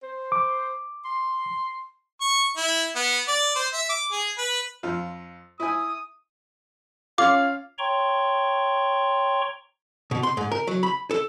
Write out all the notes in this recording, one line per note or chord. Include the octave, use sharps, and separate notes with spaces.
C5
D6
C6
C#6
E4
B3
D5
C5
E5
D6
G#4
B4
F2 F4
E4 G#5 D#6
C#4 F4 F5 D6
C#5 G5 A#5 C6 C#6
B2
C6
G#2
A#4
F#3
B5
A4